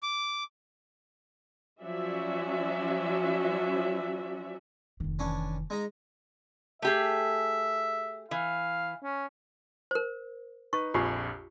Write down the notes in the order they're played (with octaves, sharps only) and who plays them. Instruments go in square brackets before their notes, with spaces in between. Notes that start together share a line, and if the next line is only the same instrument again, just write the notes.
[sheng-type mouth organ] D6
[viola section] F3 F#3 C#4 F#4 D5 E5
[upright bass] F1 D#3
[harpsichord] E3 C#4 D4
G#3 D#4 A#5
[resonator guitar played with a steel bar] A3 G4 G#4 [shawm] E5
[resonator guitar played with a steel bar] E3 [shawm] F5
[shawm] C#4
[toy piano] A#4 C5
[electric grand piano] D#4 B4 [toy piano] C#6
[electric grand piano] A#1 F2 G#5 [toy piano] F4 G4